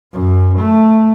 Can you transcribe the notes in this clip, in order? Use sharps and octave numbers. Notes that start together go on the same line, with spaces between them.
F#2
A3